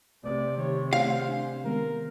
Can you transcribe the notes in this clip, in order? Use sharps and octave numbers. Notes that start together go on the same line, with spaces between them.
C3 A3 D5
D#3 G4 C#5
A3 C5 D5 F5
D4 G#5
D#3 G#3 B3 A#4